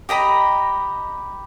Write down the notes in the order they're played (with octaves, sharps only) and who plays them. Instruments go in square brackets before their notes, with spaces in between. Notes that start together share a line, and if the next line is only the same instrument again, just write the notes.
[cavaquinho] G4 D#5 A#5 B5